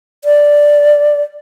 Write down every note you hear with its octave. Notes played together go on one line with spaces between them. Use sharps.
D5